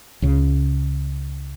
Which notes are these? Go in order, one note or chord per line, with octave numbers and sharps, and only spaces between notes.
C#2 C#3